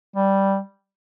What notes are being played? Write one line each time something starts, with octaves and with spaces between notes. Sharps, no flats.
G3